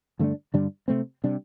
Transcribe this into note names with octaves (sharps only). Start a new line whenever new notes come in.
G2 D3 A3 D4
G2 D3 G3 D4
C3 A3 C4
C3 G3 D4